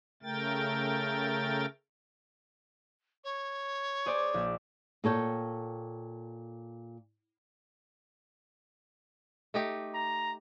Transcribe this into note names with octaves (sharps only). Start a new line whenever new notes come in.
C#3 A3 A#4 G5 A6
C#5
G#4 C5 D5
A#1
A#2 A4 C#5 G5
A3 D#4 G4
A#5